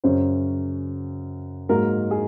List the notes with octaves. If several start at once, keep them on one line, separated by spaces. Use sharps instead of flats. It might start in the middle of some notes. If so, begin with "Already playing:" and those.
F#2 C#3 F#3 C#4 C5
G#2 F#3 A#3 A#4
G#4